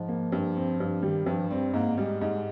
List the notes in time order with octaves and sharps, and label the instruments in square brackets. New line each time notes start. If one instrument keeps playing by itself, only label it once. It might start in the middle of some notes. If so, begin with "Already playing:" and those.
Already playing: [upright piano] G#2 [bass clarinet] F3
[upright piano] A#3
G2
C4
G2
[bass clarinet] D#3 [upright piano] G3
[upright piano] G2 [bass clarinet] F3
[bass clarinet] G3 [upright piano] C4
[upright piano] G#2 [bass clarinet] A#3
[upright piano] G3 [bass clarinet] G#3
[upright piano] G#2 [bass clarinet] G#3